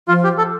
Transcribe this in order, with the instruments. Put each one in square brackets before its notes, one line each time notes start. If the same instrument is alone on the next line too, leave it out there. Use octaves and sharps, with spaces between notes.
[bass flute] F3 [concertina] F4
[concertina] G4
A4